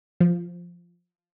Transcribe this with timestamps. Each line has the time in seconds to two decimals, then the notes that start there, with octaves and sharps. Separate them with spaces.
0.20 F3